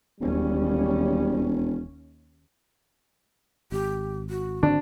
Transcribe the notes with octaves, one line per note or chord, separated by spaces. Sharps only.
E1 D#2 G3 C#4
G#1 G4
F#4
D3 C4 D4